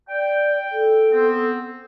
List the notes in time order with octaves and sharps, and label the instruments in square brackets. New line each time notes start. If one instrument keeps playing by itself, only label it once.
[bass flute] D5 [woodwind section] G5
[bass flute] A4
[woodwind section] B3 C4